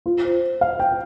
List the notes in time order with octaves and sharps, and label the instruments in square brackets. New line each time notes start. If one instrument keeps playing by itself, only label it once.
[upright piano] F4
C5
F5
G5